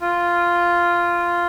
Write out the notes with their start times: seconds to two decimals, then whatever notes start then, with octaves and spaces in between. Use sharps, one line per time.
0.01 F4